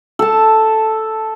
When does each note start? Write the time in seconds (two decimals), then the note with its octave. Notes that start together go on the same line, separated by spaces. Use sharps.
0.19 A4 A5